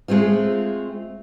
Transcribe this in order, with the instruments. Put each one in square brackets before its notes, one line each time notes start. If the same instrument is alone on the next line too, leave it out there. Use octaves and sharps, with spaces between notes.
[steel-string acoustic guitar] G#3 A3 C4 F4